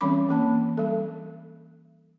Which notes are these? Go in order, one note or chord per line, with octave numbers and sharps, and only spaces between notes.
E3 G3 C4 C#4 B5 D6
E3 A#3 A5
G3 A4